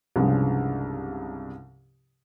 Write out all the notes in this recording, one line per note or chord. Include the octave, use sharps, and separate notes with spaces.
C2 G2 C#3 F3 G3 G#3